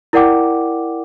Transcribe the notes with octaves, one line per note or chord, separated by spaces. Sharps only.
E4 A#4 D5 F#5 G5 D6